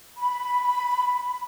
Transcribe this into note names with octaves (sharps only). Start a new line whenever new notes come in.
B5